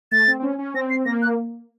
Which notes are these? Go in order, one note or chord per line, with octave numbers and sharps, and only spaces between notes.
A3 A6
C4
C4
C#4
C#4
C4 A#6
C7
A#3 A#6
F#6